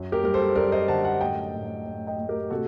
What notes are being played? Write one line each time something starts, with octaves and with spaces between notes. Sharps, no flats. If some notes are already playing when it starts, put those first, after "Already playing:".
Already playing: F#2
G4 A#4
G3 A#4
A4 C5
F#2 A#4 D5
C5 D#5
D3 F#5 A5
F#5 A5
A2 D#5 G5
A2
A2
D#5 G5
A3
G4 A#4
C3 F#4 A4